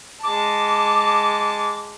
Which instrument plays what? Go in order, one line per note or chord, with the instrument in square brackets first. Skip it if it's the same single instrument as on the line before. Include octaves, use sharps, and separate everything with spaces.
[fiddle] G#3 A5 [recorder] D6